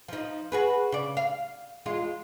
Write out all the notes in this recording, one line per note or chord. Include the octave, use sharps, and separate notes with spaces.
F3 D#4
F#4 G#4 B4
C#3 D5
F5
E2 G#3 F4